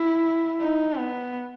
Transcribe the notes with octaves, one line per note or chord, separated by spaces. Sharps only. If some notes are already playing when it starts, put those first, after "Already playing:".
Already playing: E4
D#4
B3